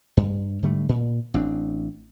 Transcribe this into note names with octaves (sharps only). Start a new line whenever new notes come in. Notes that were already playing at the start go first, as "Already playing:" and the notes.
G2
G#2 D3 G3 A3
A#2
A1 C4 D4